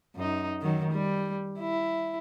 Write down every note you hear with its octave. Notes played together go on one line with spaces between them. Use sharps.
F#2 D#4
D#3 F#3
G3
E4